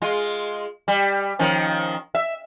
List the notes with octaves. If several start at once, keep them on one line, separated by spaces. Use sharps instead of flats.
G#3 F4
G3
D#3 F3 C#4
E5